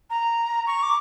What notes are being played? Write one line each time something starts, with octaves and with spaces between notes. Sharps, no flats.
A#5
C#6
D6